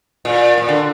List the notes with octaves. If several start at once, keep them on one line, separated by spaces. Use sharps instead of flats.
A#2
A#2
D3